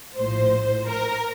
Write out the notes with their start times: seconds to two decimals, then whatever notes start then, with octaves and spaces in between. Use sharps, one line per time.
0.17 A#1 A2 F3 C5
0.88 A#4